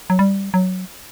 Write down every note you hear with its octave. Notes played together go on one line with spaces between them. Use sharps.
F#3
G3
F#3